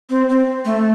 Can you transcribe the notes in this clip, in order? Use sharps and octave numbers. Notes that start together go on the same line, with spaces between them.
C4
C4
A3